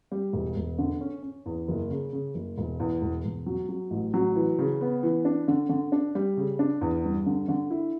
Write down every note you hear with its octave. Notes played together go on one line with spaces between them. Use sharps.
G3
E1
E1
D3
C#4
C#4
E2
F#1
C#3
C#3
F#1
E1
E2
E1
E1
F#3
F#3
A1
F#3
E3
C#3
B3
E3
D4
D3
D3
D4
G3
C#3
D4
E2
G2
D3
D3
E4